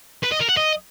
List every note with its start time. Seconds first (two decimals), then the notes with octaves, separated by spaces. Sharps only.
0.24 B4
0.32 D#5
0.40 A#4
0.49 F#5
0.57 D#5